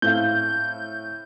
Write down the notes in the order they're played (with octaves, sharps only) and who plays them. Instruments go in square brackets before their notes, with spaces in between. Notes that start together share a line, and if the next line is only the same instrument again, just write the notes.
[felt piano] A2 C4 F5 [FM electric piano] G6